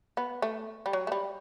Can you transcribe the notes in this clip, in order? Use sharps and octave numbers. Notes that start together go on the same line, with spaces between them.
B3
A3
G3
F#3
A3
G3